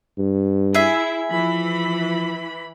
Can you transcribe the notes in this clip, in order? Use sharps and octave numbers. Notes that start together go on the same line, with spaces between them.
G2
E4 G#4 E5
E3 F3 B5